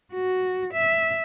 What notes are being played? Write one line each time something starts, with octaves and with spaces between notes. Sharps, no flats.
F#4
E5